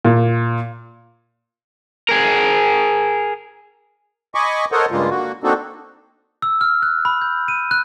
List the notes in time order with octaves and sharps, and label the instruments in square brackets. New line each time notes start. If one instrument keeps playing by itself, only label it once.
[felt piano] A#2
[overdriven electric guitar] G#4 A#4
[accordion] D#5 G#5 B5 C#6 D6
A4 A#4 C5 C#5 D#5 F#5
G2 C#3 G3 G#3 A#3 F4
D3 A#3 F#4
A#3 C4 D4 D#4 F#4 A4
[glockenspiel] E6
F6
F#6
B5
G6
D#7
F#6